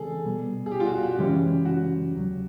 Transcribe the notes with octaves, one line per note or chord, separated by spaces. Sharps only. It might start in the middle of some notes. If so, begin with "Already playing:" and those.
Already playing: C#3 E3 G#3 C4 G#4 A4
B2 G3 B3
G#4
G4
F4
F#4
F#4
F#2 C#3 E3 G#3 C#4 G4
F#4
D#2 C#3 F#3